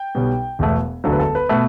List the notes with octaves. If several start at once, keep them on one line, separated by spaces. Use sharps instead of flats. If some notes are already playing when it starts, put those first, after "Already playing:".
Already playing: G5
B1 B2 G3
E1 E2 B2 A3
E1 D2 D3 F#3 A4
B4
A4
B4
B2 A3 B4